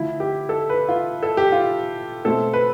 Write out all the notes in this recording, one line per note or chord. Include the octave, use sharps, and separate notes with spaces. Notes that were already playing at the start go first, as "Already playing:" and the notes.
Already playing: D3 F3 A3 E4
G4
A4
B4
F4
A4
G4
F4
B2 A3 C4 A4
B4